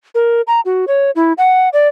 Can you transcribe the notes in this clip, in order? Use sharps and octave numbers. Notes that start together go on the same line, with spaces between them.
A#4
A#5
F#4
C#5
E4
F#5
D5